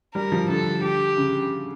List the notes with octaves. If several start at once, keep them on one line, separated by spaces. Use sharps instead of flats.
G3 A#4
F3
D3 A4
G4
C#3